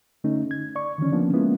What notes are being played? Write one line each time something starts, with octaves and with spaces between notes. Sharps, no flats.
D3 A3 C#4 D#4
G#6
D5 C#6
D3 D#3 F3 C#4
F3 A#3 B3 C#4 D4
G#3 A#3 B3 C#4 E4 F4